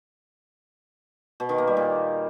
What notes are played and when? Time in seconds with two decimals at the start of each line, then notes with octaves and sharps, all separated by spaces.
1.40 B2
1.49 D#3
1.58 A#3
1.67 G3
1.77 A#2